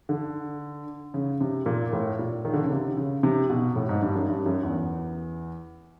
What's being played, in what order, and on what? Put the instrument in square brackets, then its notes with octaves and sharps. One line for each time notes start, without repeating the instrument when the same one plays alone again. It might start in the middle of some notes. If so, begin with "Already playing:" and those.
[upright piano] D3
C#3
C3
A#2
A2
A#2
D#3
D3
C#3
C3
C#3
C3
B2
A2
G#2
G2
F#2
G2
F#2
E2